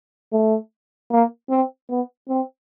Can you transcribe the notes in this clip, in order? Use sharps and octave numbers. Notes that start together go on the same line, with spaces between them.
A3
A#3
C4
B3
C4